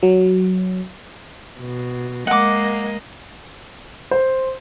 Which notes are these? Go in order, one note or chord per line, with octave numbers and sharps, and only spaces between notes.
F#3
B2
G#3 A#3 D#5 F#5 D6
C5